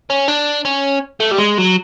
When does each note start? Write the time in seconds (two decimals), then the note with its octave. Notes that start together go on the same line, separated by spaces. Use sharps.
0.10 C#4
0.28 D4
0.65 C#4
1.20 A3
1.31 G3
1.38 G#3
1.58 F#3